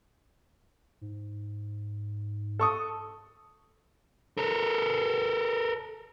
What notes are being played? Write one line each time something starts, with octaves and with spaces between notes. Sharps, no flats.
G#2
A4 C#6 D#6
A4 A#4